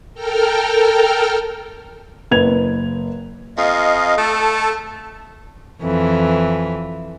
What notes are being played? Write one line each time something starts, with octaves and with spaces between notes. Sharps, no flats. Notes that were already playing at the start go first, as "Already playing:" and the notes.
A4 A#4 G5 F6
F#1 B4 G#6 F7
F2 D#5 F5
A3 A4 A5
F2 E3